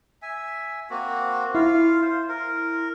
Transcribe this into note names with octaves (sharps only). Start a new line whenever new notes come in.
E5 G#5
A#3 C4 F#4
E4 F4 F5
C5
A#4